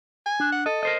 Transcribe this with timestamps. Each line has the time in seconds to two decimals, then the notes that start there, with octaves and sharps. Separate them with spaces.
0.26 G#5
0.40 D4
0.52 F#5
0.66 A4 D#5
0.83 A#4 C5 D#5